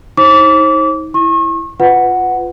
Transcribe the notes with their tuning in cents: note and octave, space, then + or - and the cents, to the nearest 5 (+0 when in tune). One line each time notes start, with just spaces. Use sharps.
D#4 +35 C5 +40 D6 -30
E4 +0 C#6 -40
F4 +0 B4 +15 F#5 +0